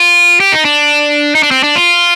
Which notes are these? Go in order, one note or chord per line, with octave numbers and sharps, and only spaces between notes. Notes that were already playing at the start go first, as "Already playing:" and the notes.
Already playing: F4
G4
D#4
D4
D#4
D4
C4
D4
F4